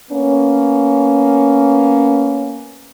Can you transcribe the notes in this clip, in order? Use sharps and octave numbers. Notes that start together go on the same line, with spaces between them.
A#3 B3 C#4